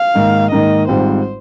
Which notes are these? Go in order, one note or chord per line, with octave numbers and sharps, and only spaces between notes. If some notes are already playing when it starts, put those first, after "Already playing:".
Already playing: F5
G#2 D#3 A#3 D#4 A#4
G#2 D#3 A#3 D#4 A#4 D#5
G#1 G#2 G3 C4 F4 C5